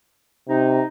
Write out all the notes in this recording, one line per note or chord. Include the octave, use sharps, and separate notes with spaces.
C3 D#4